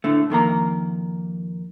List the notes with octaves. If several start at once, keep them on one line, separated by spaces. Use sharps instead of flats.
A2 D3 A3
F2 D#3 A#3 A#5